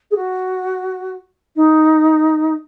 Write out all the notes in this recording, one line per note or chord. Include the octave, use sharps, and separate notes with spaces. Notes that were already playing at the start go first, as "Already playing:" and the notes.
G#4
F#4
D#4